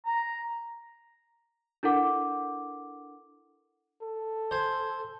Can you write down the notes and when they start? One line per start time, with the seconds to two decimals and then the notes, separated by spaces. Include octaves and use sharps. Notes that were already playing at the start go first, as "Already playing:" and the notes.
0.06 A#5
1.83 D4 E4 A4 A#4 F#5 D6
4.02 A4
4.51 C5 G#5